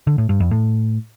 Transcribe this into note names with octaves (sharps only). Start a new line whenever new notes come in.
D3
A2
G2
F2
A2